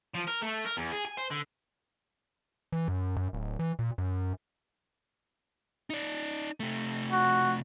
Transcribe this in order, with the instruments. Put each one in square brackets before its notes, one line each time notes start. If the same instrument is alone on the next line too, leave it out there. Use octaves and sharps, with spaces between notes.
[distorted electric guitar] F3
A#4
A3
A#4
E2
G#4
G#5
C5
D3
[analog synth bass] E3
F#2
F#2
D1
E3
A#2
F#2
[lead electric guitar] D#4 D5
C3 A3
[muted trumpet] F#4